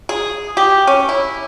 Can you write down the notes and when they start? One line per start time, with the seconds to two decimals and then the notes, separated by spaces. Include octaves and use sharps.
0.09 G#4
0.57 G4
0.87 C#4
1.09 E4